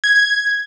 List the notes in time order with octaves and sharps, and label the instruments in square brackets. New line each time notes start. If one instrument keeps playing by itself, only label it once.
[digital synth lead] G#6